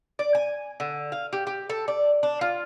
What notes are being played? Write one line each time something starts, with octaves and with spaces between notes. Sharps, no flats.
D5
G#5
D3
F5
G4
G4
A4
D5
D4
F4